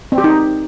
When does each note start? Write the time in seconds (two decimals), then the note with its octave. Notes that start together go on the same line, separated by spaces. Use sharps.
0.12 C4
0.18 G4
0.24 D#4